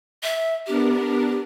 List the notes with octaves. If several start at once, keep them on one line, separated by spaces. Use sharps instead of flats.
E5
B3 D4 G4 A#4